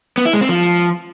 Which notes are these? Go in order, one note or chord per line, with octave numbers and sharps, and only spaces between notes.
B3
E4
G#3
C4
F3